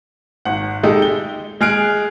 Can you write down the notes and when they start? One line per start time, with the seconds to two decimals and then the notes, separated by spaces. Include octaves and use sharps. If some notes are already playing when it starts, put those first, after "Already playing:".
0.45 G#1 F#5
0.83 G#3 D#4 G4 A4
1.02 G7
1.61 G#3 G#4 F6 F#6 D7